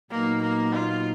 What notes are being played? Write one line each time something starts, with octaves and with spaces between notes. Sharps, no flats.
A#2 F#3 A#3 B3 D#4
A#3
F4